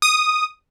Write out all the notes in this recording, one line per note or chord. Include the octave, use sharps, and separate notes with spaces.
D#6